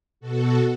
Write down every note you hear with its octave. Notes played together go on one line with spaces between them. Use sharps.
B2 F#4 A4